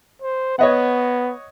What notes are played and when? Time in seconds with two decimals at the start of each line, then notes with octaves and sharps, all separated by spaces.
0.22 C5
0.59 B3 C#5 D#5 F#5